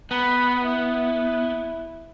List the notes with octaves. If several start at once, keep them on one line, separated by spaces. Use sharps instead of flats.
B3 B5
E4